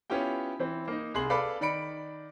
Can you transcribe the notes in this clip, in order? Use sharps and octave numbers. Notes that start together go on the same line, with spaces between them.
B3 C#4 E4 F4 G4 G5
E3 C4
A#3 D#4
C2 G#4 C6 F#7
A4 B4 D5 F5 B5 D6
D#3 D5 B5 C#7 D7